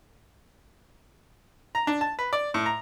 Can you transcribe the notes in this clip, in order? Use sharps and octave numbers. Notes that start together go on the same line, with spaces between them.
A#5
D4
A5
B4
D5
A2
A#5